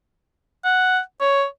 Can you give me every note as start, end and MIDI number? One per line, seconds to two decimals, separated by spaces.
0.64 0.99 78
1.21 1.45 73